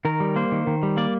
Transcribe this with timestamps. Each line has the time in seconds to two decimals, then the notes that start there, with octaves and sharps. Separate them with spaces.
0.05 D#3 A#4
0.20 G3
0.36 A#3 C5
0.52 D#3
0.67 D#3
0.83 G3
0.97 A#3 D5